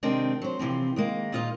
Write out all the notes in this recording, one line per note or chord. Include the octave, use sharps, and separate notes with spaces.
C3 D#3 G#3 C4 D4
F#3 C5
C3 E3 F3 C4
D#3 G#3 A#3
A#2 D#4 F4 C5 D#5